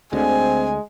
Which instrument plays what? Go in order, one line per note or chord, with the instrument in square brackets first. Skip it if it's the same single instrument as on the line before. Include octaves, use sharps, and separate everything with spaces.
[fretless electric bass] D2 D3 [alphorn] G#3 [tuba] C4 [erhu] G#5